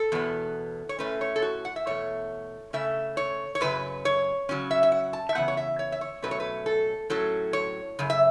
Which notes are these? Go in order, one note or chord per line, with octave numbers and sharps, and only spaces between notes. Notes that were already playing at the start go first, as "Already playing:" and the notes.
Already playing: A4
E2 B2 B3
C#5
A2 A3 C#4 B4
C#5
A4
F#4
F#5
E5
E2 B2 A3 C#5
C#3 A3 C#4 E5
C#5
C#5
F#2 C#3 F#3 B4
C#5
C#3 F#3 C#4
E5
E5
F#5
A5
E5
C#3 E3 B3 F#5
C#5
E5
C#5
E5
C#5
B2 F#3 A3 C#4 B4
C#5
B4
A4
A2 F#3 C#4 A4
C#5
F#2 C#3
E5